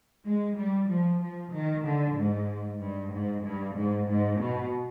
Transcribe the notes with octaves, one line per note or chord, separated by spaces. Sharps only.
G#3
G3
F3
F3
D#3
D3
G#2
G2
G#2
G2
G#2
G#2
B2